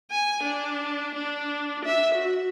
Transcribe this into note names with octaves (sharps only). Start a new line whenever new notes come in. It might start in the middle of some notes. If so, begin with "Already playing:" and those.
G#5
D4
D4
E5
F#4